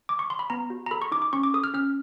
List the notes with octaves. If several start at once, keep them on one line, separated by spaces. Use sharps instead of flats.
D6
C#6
C6
B5
B3 A#5
F#4
A#5
A4 B5
C#6
D#4 D6
D6
C#4 C#6
D6
A4 D#6
F6
C#4 F6